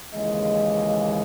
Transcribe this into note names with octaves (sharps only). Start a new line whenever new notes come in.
D#2 C#3 E3 G#3 D#5